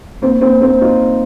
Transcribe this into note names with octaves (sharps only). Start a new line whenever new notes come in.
A#3 C4
A#3 C4
A#3 C4
D#4 F4